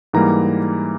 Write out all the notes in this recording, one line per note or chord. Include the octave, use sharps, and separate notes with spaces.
G#2 E3 G3 A#3 A#5